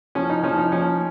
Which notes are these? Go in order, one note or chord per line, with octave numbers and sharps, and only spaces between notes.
F3 C#4
D#4
F3 C#4
D#4
F3 C#4